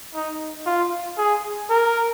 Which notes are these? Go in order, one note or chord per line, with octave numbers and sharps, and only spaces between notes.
D#4
F4
G#4
A#4